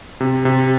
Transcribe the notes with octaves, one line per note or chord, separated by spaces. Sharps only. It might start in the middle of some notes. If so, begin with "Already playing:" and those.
C3
C3